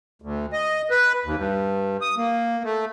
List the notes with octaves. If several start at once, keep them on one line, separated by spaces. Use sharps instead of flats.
D2
D#5
B4
D#2
G2
D#6
A#3
A3